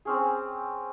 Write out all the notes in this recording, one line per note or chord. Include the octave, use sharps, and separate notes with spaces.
C4 C#4 G#4